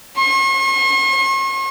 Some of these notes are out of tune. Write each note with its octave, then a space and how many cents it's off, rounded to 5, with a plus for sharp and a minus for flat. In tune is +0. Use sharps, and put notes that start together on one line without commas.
C#6 -45